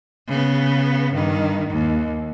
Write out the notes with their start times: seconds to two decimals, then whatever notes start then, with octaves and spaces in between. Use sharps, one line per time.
0.27 C#3 B3
1.14 G2 D#3
1.70 D#2